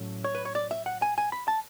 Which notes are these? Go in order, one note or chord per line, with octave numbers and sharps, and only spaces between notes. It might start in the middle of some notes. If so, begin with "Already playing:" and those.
Already playing: A2 F#3 A3 C#4
C#5
B4
C#5
D5
E5
F#5
G#5
G#5
B5
A5